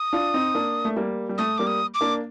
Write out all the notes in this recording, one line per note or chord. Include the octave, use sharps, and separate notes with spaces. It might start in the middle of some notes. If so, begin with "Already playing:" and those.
Already playing: D#6
D4 F4
C4 D#4
A#3 D4
A3
G3 A#3
G3
A3 D#6
G3 A#3 D6
D#6
D6
A#3 D4